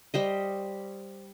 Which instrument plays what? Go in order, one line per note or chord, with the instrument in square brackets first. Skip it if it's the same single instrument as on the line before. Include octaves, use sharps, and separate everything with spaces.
[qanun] G3 C5 D#5